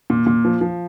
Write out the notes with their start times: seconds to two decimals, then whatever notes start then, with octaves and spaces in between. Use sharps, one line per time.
0.10 A#2
0.27 A#2
0.45 F3
0.61 F3